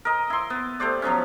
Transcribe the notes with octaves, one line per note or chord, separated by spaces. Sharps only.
A#4 D#5
E4 C6
B3
A3 G4 C5 D5
F3 F#3 B3 C#4